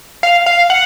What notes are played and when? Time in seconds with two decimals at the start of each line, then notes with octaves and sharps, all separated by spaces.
0.23 F5
0.46 F5
0.70 F#5